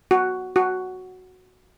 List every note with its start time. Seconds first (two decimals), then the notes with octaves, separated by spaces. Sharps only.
0.11 F#4
0.56 F#4